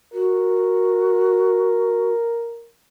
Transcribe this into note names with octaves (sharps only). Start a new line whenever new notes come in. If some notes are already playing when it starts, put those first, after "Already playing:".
F#4 A#4